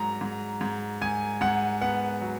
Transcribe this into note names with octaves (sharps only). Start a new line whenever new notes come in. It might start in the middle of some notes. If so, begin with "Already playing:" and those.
Already playing: G#2 F#3 A#5
G#2
G#2
G#2 G#5
G#2 F#5
B3 F#5
F#3